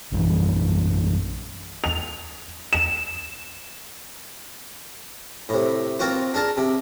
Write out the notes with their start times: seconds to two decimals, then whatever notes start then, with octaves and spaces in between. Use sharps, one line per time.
0.12 A#1 F#2 E3 G3
1.84 F7
2.73 E7
5.49 A2 C3
5.99 A#3 C4 F4 F#4 C5
6.34 D4 G#4 A#4 A5
6.57 C3